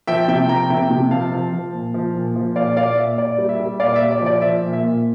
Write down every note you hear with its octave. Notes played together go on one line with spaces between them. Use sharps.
F3 E5 G5
C3 E5 G5
F3 G5 A#5
C3 E5 G5
C3
F3 F5 A5
F3
F3
A#2
F3
A#2
F3
A#2 D5 F5
A#2 D5 F5
A#2 E5
A#2 D5
G3
E5
G3
A#2 D5 F5
E5
A#2
D5
F3
D5
F3 E5
A#2
E5
A#2